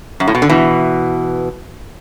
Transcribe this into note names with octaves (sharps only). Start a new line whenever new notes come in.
F#2
A2
B2
D3
B2 E3